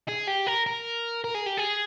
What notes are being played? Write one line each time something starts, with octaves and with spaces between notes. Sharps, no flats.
G#4
G4
A#4
A#4
A#4
G#4
G4
G#4